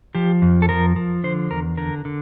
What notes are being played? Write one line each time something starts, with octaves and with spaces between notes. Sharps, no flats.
F3 G4
F2
A4
F3 A#4
F3
D3 C5
E2 A#4
D3 A#4
D3